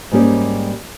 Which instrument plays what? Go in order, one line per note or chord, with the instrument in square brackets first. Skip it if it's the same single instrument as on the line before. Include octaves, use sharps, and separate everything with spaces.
[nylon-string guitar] G#2 G3 A#3 C#4 G4